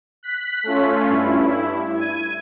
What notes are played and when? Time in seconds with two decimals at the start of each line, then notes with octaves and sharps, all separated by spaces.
0.23 F#6 B6
0.64 A3 C#4 F4
1.09 G2 E4
1.94 G#6 D#7